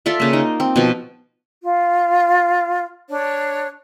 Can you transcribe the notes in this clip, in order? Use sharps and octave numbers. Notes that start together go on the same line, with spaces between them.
F4 A4 D5 E5
C#3 A#3
D#4
C4
B2 F3
F4
D4 C#5